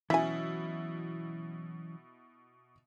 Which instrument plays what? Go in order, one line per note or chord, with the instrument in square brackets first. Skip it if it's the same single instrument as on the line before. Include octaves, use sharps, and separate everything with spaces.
[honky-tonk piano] B2 E4 [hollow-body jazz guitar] E3 F#3 C#4 [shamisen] E5 G#5